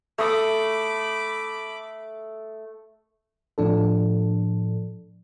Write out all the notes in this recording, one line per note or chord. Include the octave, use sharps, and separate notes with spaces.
A3 B5 D6 D#6
A2 F3 D4 A4